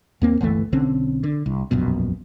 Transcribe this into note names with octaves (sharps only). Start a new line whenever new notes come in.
D#2 A#3 C4
G1 C#2 E3 A3
B1 D3 C4 C#4
D3
C2
E1 A#1 F#2 B2